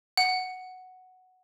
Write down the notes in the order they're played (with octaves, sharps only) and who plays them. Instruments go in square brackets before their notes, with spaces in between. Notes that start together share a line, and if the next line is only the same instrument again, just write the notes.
[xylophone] F#5